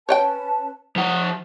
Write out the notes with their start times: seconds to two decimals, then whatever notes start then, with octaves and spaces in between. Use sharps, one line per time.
0.09 C#4 B4 C#5 D#5 G5 A5
0.96 F3 F#5 D#6